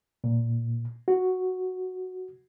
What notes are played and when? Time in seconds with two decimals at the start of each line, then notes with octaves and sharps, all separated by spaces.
0.24 A#2
1.08 F#4